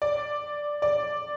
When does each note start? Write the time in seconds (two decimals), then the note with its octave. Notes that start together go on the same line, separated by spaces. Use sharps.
0.02 D5
0.82 D5